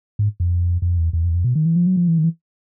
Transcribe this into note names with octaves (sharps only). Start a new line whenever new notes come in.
G#2
F2
F2
E2
E2
F2
E2
F2
B2
D#3
E3
F3
F#3
F3
E3
D#3
E3